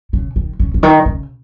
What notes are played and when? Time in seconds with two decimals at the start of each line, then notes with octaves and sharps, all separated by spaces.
0.13 C#3
0.36 D#3
0.59 C#3
0.74 C#3
0.83 D#3
1.06 C#3